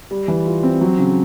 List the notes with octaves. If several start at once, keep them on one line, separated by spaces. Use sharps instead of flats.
G3
E3
F4
C4
F#3
C#3